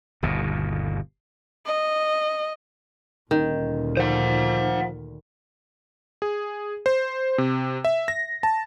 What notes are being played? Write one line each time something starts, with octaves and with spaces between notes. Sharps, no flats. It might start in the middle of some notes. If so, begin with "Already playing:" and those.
G1 D#2 B2
D#5
D#1 D2 A#2 D#3
F3 C5 F#5
G#4
C5
C3
E5
A#6
A5